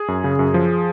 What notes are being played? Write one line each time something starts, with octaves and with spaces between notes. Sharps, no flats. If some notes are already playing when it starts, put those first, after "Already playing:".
Already playing: G#4
F#2
C#3
F#2
F3